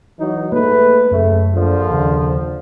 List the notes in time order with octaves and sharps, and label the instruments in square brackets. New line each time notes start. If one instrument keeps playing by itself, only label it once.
[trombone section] E3 F#3 D#4
[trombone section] G#2 A3 B4 [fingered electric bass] A#3
[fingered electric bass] F#2 [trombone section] C#3 A3
[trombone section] A#1 D3 F3
[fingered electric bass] D#2 C#3